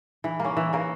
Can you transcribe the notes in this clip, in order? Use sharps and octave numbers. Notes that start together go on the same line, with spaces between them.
E3
A#3 C#4
E3
A#3 C#4